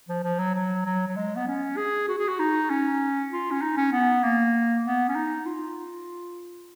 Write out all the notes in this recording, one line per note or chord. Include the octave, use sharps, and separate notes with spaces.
F3
F3
F#3
F#3
F#3
F#3
G#3
B3
C#4
G#4
F#4
G#4
F#4
D#4
C#4
F4
C#4
D#4
C#4
B3
A#3
B3
C#4
D#4
F4